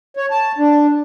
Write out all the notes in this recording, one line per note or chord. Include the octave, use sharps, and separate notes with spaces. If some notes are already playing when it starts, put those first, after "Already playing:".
C#5
A5
D4